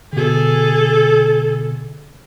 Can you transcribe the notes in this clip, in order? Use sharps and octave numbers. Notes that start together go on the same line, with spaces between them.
B2 D3 G#4 A4